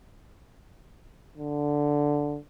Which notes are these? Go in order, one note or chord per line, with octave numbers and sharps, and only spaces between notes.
D3